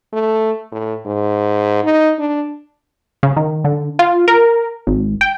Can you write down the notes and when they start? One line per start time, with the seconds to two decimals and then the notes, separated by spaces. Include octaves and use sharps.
0.13 A3
0.72 A2
1.06 G#2
1.84 D#4
2.19 D4
3.23 C#3
3.36 D#3
3.64 D3
3.99 F4
4.28 A#4
4.87 G#1
5.21 G5